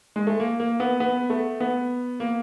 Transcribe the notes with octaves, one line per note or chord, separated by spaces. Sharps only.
G#3
A3
A#3
A#3
B3
B3
A3
B3
A#3